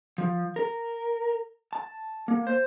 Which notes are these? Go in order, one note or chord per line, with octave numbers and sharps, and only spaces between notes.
F3
A#4
A5
A#3
C5